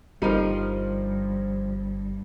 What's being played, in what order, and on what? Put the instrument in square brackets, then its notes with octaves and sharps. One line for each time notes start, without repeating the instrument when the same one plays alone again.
[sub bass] G1 [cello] G2 [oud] F3 D#4 [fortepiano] G3 A#4